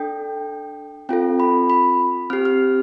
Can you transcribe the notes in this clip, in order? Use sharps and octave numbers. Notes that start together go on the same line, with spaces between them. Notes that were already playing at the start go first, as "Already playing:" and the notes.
Already playing: D4 A4 G5
C4 F4 A4 G5
B5
B5
C4 G4 F6
F6